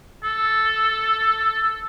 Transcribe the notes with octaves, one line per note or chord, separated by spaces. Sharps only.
A4